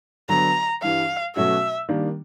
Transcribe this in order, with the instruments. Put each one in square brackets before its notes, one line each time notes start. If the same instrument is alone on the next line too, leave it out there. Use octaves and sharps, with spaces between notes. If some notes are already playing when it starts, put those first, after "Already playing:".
[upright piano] D3 F#3 B3 [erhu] A#5
[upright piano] G2 E3 G3 [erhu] F5
[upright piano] B2 F#3 A3 C#4 F#4 [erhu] E5
[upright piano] D#3 G3 A#3 D4